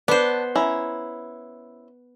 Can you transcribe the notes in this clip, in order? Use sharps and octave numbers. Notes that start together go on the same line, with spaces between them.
B3 D4 C5
C#4 E4 A#5